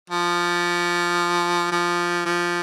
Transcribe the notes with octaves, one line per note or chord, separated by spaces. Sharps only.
F3
F3
F3